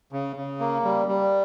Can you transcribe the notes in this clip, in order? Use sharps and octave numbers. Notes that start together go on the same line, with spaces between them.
C#3
C#3
A#3
G3
G3